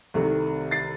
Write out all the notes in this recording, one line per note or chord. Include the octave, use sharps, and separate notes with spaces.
C2 C3 D#3 A3
A6 C7